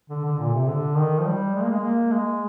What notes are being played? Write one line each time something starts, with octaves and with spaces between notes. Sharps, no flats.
D3
D3
A#2
C3
D3
D#3
F3
G3
G#3
A#3
G#3
A#3
G#3